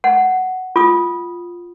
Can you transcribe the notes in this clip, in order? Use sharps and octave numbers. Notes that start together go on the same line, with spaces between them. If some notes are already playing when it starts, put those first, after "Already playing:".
F#5
F4 D#6